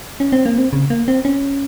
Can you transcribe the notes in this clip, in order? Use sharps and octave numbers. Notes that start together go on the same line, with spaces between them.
C#4
C4
A#3
C4
C#3
A#3
C4
C#4